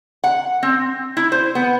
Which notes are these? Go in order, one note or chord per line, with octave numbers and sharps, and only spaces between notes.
F#5
C4
E4
C5
B3